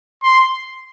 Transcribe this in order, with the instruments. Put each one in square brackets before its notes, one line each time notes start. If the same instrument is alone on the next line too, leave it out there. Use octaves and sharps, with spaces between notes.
[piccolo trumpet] C6